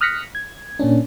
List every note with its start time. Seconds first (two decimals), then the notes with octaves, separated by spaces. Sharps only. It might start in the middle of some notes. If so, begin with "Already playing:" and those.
0.01 D#6 F6 F#6 A#6 B6 C#7
0.35 G#6
0.79 A#2 A#3 C#4 D4